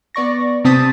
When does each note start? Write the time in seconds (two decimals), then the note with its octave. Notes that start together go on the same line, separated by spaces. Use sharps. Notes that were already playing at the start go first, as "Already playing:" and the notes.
0.15 B3 D5 C#6 A#6
0.64 C3 C4 A5 D#6 A6 B6